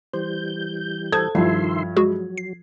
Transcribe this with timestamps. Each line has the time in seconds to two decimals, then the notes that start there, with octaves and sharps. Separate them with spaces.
0.14 E3 G3 C5 G6
1.12 A4 C5 D#6 G#6
1.35 G2 D#3 F3 E4 E5 C6
1.96 F#3 G#3 F#4 G#4
2.38 C7